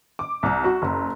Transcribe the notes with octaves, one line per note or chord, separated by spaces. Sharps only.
D6
C2
F#4
F#1